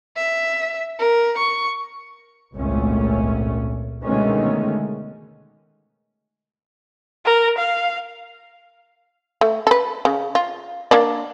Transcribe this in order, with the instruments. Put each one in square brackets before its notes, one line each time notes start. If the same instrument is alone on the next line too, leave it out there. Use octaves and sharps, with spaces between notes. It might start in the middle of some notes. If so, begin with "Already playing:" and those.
[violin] E5
A#4
C#6
[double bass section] G#1 C#2 A#2 A3 C#4
B2 D3 D#3 G#3 A3 C#4
[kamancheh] A#4
F5
[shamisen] A3
A4 B4
C#3
F4
A#3 D4 D5